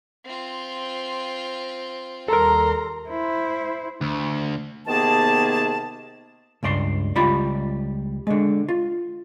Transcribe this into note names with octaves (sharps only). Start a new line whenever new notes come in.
C4 F4
D#2 G3 A4 A#4 A#5 C6
E4 C5
D2
C3 D#3 A#3 B3 G#4 A5
C#2 G2 D5 C6
C#2 G3 F4 B5
D3 G#3
F4